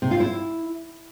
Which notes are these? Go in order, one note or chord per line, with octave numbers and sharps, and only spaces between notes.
C3
F4
E4